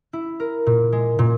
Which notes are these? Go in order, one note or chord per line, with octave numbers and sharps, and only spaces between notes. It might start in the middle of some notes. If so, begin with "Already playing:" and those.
E4
A#4
A#2
G#3
A#2